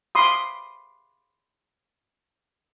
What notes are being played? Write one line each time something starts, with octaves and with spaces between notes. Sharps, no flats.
B5 C6 D6 D#6